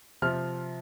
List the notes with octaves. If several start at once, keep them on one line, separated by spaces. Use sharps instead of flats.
C3 F3 F6